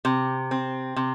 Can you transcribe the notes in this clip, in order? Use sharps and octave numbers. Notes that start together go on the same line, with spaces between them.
C3
C4
C3